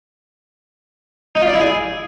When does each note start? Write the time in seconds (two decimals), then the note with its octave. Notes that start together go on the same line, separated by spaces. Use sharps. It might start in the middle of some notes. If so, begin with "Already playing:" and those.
1.35 D#4
1.41 F4
1.47 D5
1.53 E4
1.60 G#4